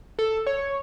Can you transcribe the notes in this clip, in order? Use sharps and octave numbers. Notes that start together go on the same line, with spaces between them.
A4
C#5